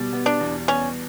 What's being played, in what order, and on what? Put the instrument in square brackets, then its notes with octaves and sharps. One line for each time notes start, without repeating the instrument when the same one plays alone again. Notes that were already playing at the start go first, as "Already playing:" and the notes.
Already playing: [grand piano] B2 G3
B3
[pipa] D4
[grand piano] E2
[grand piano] B3 [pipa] C#4